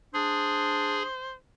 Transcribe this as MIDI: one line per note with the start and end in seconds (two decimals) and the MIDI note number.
0.14 1.04 62
0.14 1.03 68
0.14 1.33 72